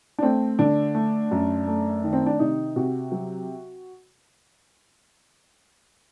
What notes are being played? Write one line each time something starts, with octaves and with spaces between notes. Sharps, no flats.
D4
A3 C4
D3 D4
A3
F#2
A3
D#3
C4
D4
C3 D#4
C3 F#4
F#3